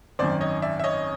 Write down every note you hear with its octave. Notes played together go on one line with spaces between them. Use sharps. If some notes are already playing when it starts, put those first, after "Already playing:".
G#1 F#2 D#3 C5 D5
C#5 D#5
D5 E5
E5
C#5 D#5